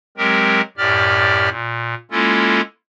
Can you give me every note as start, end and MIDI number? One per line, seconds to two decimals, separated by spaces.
0.18 0.61 54
0.18 0.61 56
0.18 0.61 60
0.18 0.61 67
0.18 0.61 70
0.77 1.49 42
0.77 1.49 45
0.77 1.49 67
0.77 1.49 74
0.77 1.49 89
1.49 1.95 46
2.11 2.61 56
2.11 2.61 58
2.11 2.61 61
2.11 2.61 64
2.11 2.61 65
2.11 2.61 69